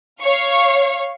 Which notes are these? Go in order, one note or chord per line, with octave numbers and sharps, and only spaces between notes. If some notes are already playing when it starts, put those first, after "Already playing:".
C#5 F5 C#6